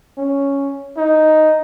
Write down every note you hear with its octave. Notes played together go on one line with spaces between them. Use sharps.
C#4
D#4